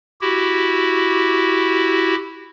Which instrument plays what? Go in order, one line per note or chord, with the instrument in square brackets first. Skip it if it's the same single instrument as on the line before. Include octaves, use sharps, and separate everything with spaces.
[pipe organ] E4 F#4 G4